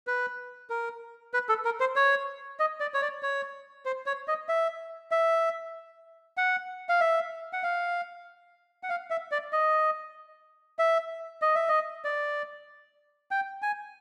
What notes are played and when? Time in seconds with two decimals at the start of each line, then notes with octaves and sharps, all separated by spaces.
0.07 B4
0.70 A#4
1.34 B4
1.49 A4
1.65 A#4
1.80 C5
1.96 C#5
2.59 D#5
2.80 D5
2.94 C#5
3.02 D5
3.23 C#5
3.85 C5
4.06 C#5
4.28 D#5
4.49 E5
5.11 E5
6.37 F#5
6.89 F5
7.01 E5
7.53 F#5
7.63 F5
8.83 F#5
8.89 F5
9.10 E5
9.31 D5
9.53 D#5
10.79 E5
11.42 D#5
11.55 E5
11.68 D#5
12.05 D5
13.31 G5
13.62 G#5